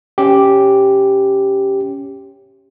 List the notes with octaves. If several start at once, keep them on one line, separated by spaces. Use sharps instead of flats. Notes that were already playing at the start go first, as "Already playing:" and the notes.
C#4 G4